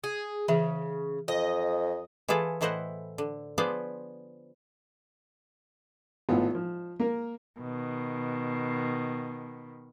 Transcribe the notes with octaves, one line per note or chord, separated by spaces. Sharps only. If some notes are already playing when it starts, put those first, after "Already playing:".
G#4
C#3 E3 E5
F2 D#5
E3 E4 F4 G#4 A4
A2 E3 E4 C5 D#5 F#5
D3
F3 B3 G#4 C5 D5
G#1 A2 B3 F4
F3
A#3 A#4
B2 D#3